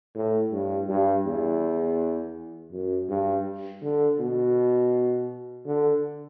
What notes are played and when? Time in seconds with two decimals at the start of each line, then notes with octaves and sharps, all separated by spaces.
0.15 A2
0.52 G2
0.88 G2
1.25 E2
2.72 F#2
3.09 G2
3.82 D3
4.19 B2
5.66 D3